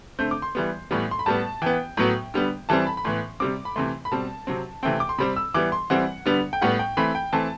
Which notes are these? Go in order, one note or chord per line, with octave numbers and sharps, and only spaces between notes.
D3 A3 C4 G6
D6
C6
E3 G3 B3
A2 E3 G3 B3
C6
B5
A2 G3 B3 A5
E3 B3 G5
A2 F#3 B3
D3 G3 B3
E3 G3 C4 A5
B5
B5
A2 E3 B3 C6
C3 G3 C4 D6
B5
C3 E3 A3 C6
B5
B2 G3 C4 A5
C3 F#3 C4
C3 E3 A3 C4 G5
D6
C6
C3 G3 C4 B5
E6
E3 G3 B3 D6
C6
E3 G3 C4 F#5
D3 G3 B3
G5
A2 G3 B3 F#5
G5
E3 A3 C4 B5
G5
E3 A3 C4 A5